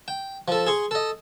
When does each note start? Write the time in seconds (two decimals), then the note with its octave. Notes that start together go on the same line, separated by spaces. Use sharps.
0.08 G5
0.48 F3 A4
0.67 G#4 C6 C#6
0.91 A4 D#5